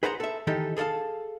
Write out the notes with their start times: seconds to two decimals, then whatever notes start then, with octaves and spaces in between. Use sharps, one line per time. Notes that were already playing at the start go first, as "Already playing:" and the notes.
0.03 G#4 B4 C5 F#5 A5 A#5
0.20 A4 E5
0.47 D#3 E3 D#4 G4 A4
0.77 G#4 A4 C5 F5 A5